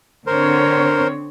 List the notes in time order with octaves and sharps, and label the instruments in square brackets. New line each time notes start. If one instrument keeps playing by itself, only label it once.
[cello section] D3 C4 C#5 [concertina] A#4 C5